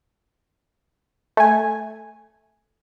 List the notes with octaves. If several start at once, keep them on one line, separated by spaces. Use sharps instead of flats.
A3 G#5